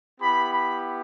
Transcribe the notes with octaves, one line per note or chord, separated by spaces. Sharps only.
B3 E4 G4 B5
B5